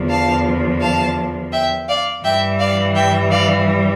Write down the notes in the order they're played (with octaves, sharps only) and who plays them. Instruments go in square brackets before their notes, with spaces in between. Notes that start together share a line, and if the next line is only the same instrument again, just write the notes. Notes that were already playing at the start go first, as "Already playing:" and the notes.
Already playing: [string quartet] E2 D3 F3
F5 A5
F5 A5
E5 G5
D5 F5
G2 E3 G3 E5 G5
D5 F5
E5 G5
D5 F5